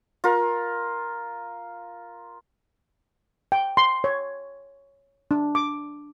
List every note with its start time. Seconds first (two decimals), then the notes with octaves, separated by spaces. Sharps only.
0.24 F4 A#4
3.52 G5
3.77 C6
4.04 C#5
5.31 D4
5.55 D6